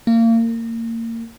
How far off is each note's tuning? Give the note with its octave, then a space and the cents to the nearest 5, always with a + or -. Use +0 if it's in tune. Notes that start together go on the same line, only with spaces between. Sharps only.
A#3 -30